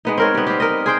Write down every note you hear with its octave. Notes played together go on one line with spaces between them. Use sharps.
G#3 B3 D#4
C4 A#4 C#5
G3 B3
C4 G4
A#4 D#5
G#4 C5 G5